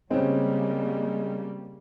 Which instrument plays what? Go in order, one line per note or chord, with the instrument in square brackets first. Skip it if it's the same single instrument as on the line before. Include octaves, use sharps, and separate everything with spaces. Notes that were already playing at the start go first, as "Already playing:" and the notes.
[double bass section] C#3 G3 A#3 [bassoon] G#3 [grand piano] C4 C#4